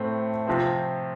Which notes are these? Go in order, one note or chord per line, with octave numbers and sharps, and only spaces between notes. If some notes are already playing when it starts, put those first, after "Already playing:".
Already playing: A2 A3 C4
C3 F3 C4